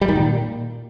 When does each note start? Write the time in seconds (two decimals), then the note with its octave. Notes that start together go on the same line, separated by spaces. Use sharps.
0.01 G3
0.08 D#3
0.15 A#2